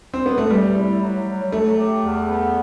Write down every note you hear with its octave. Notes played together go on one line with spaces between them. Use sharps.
C4
B3
A3
E2 G3
E4
F#3
F#3
F#3 A3
G4
E2
B3